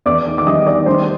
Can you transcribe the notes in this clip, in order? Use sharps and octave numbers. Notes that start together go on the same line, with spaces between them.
E2 D5 D6
D#3
D6
G3 D#5 D#6
D#3 D5 D6
G3 C5 C6